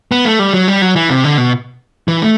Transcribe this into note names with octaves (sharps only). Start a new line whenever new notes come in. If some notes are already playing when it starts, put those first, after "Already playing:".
B3
A3
G3
F#3
G3
F#3
E3
C3
D3
B2
E3
A3